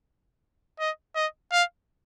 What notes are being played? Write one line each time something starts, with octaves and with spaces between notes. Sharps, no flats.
D#5
D#5
F5